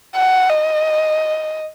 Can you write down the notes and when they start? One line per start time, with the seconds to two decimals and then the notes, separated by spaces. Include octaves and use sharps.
0.16 F#5
0.50 D#5